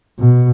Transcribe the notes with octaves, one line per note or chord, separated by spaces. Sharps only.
B2